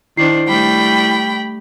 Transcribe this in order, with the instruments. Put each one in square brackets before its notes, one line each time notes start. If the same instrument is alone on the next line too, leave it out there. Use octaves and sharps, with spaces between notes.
[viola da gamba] D#3 D4 C5 [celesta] E4 C7
[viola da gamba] G3 A3 [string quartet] G5 B5